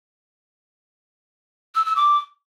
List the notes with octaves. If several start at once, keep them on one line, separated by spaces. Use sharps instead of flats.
E6
E6
D6